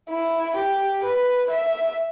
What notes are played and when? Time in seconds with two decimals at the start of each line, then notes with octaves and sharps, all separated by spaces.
0.10 E4
0.57 G4
1.04 B4
1.51 E5